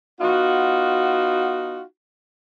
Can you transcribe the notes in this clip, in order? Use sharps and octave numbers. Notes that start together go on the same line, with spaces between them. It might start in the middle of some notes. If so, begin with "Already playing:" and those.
B3 D#4 F4 F#4